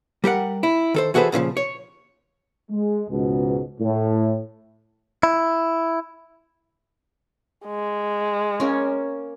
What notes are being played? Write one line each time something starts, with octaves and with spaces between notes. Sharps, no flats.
G3 G4 A#4 F#5
E4
D#3 A4 C5
E3 F#4 G#4 A4 B4 C5
A#2 C#3 E3 F3
C#5
G#3
C#2 G#2 B2
A2
E4
G#3
A#3 C#4